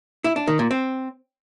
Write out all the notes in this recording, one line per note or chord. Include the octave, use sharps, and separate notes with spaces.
E4
D4
D#3
A#2
C4